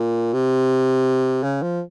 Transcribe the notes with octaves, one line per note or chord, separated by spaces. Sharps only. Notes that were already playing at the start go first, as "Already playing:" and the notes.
Already playing: A#2
C3
C#3
F3